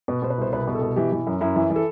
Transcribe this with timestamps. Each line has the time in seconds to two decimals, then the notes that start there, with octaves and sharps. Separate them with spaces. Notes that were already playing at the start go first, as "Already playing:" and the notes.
0.08 B2 B4
0.22 B2 C5
0.30 B4
0.38 C2 C5
0.53 C2 B4
0.67 B2
0.75 A4
0.81 B2
0.96 E3 G4
1.12 E3
1.27 F#2
1.41 F#2 E4
1.56 E3
1.70 E3
1.76 A4